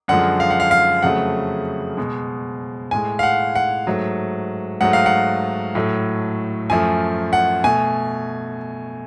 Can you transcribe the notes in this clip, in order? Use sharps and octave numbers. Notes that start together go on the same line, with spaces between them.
F#2 D3 F3 G#3 F#5
F5
F#5
F5
F5
F2 C#3 F#3 A3 F#5
B2 G#3
A2 G#3 G#5
F5
F#5
F#5
G#2 F#3 A3
G#2 F#3 A3 F#5
F5
F#5
A2 F#3 A3
F#2 F3 A3 G#5
F#5
B2 A3 G#5